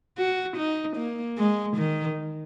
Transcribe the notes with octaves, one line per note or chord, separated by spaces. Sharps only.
F#4
D#4
A#3
G#3
D#3